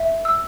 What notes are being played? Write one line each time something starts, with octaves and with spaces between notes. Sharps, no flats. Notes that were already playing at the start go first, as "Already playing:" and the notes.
Already playing: E5
E6